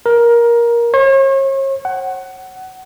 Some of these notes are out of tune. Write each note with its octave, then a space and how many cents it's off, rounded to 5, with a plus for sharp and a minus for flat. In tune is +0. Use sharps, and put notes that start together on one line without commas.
A#4 +15
C#5 -40
F#5 +20